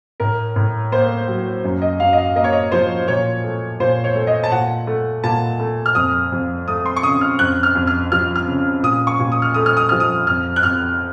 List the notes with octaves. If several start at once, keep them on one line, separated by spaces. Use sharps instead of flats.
A2 A#4
A2
A#3 C5
F#3
F#2
D#5
F#2 F5
D#5
F5
A#3 D#5
C#5
D#5
F3 C5
A#2 C#5
A3
A#2 C5
C#5
A3
D#5
A5
A#2 F#5
A3
A#2 A5
A3
F6
F2 D#6
F2
A3 D#6
C6
C#6
C#3 D#6
F6
F2 F#6
F6
F2
F6
F3 F6
F6
C#3
A#2 D#6
C#6
A#2
D#6
F6
A3 D#6
F6
D#6
F3 F6
D#6
F2 F6
F#6
F2 F6